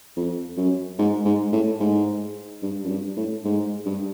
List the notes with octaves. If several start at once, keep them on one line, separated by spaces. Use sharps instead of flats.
F2
F#2
G#2
G#2
A2
G#2
G2
F#2
G2
A2
G#2
G2